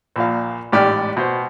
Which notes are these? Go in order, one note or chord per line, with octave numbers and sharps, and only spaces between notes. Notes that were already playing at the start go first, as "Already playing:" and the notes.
A#1 A#2 F5
A1 G#2 G4 D5 B5 F6
B2 C5